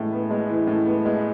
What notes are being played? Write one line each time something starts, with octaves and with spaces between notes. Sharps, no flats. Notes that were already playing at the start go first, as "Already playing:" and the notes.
Already playing: A2 E3 G#3 B3
B3
G#3
E3
A2
B3
G#3